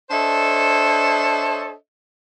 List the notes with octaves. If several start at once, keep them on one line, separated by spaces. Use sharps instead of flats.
D4 A4 C5 C#5 D#5 E5